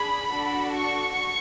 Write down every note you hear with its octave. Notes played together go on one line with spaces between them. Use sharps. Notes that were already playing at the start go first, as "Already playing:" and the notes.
Already playing: D4 G#4 B5
D4 F#4 A4
C#6